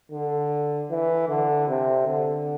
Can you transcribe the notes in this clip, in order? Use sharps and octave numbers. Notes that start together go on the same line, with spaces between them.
D3
E3
D3
C3
D3